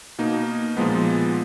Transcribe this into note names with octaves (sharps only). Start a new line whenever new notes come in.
B2 A#3 D#4
A#2 F3 G#3 B3